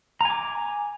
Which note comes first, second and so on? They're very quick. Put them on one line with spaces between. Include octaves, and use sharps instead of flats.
A#5 G#5 D6